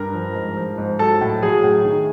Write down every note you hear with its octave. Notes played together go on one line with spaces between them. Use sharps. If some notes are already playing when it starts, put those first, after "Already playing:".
Already playing: G2 A#4 A#5
F3
G#2
F3
G#2
F#3 A4 A5
A2
F#3 G#4 G#5
A2
D#3